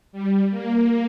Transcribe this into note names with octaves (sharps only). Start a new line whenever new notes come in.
G3
A#3